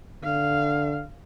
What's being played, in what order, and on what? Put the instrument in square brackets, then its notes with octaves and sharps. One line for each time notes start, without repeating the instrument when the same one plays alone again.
[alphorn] D3 [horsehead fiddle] F5